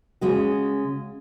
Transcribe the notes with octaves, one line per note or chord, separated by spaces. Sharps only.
C#3 G#3 F#4